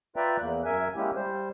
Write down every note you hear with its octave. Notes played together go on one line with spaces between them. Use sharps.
F4 B4 D5 E5 G5 A#5
E2 A#3 F#6
F#2 A#4 E5 G#5
G#3 A#3 C#4 E4 G4
G3 C5